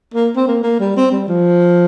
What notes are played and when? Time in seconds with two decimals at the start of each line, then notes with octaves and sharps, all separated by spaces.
0.14 A#3
0.36 C4
0.48 A#3
0.63 A#3
0.80 G3
0.97 C4
1.12 G3
1.28 F3